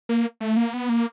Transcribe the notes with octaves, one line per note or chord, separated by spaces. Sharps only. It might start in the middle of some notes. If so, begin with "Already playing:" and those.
A#3
A3
A#3
B3
A#3